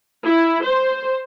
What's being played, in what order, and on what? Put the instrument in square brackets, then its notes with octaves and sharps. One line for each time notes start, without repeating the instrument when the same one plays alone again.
[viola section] E4
C5